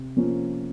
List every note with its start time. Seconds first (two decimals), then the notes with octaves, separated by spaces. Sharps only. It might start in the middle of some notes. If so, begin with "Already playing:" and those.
Already playing: C3
0.17 F3 A#3 C#4 F4